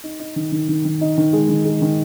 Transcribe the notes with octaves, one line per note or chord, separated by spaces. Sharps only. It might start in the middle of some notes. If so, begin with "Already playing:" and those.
D#4
D#4
D#3
D#3
D#3
D#3
D#4
D#3
G#3
D#3
G#3
D#3